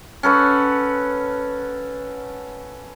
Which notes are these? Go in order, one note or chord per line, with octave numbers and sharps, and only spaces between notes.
C#4 A4 B4 F#5